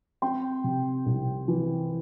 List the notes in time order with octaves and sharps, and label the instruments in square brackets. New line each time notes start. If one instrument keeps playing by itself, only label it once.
[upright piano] C4 G5 C6
C3
C2
E3